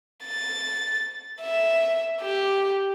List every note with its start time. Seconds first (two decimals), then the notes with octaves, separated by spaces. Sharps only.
0.25 A6
1.41 E5
2.21 G4